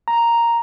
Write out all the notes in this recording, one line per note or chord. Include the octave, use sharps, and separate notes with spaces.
A#5